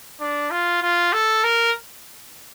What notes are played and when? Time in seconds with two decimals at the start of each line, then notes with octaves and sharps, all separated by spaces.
0.21 D4
0.51 F4
0.83 F4
1.13 A4
1.44 A#4